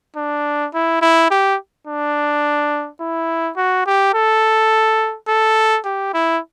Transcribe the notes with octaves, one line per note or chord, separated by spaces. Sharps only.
D4
E4
E4
G4
D4
E4
F#4
G4
A4
A4
G4
E4